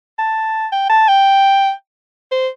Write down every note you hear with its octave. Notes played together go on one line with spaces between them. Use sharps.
A5
G5
A5
G5
C5